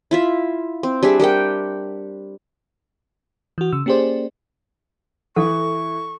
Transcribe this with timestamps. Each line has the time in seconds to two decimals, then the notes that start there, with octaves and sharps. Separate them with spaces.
0.11 E4 F4 E5
0.83 C4
1.03 G3 D4 G#4 E5
1.20 G3 A#4 F#5 G5
3.58 E3 F#4
3.73 C#3 E6
3.86 A#3 C#4 G4 G#4 C5 D5
5.36 E3 A4 C#6